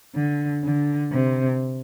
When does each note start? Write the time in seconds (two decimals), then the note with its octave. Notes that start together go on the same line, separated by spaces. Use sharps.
0.15 D3
0.64 D3
1.12 C3